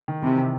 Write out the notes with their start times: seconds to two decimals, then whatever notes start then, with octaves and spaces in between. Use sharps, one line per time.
0.08 D#3
0.22 C3 E3
0.37 C3